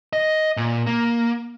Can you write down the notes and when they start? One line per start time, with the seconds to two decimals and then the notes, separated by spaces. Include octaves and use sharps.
0.13 D#5
0.57 A#2
0.87 A#3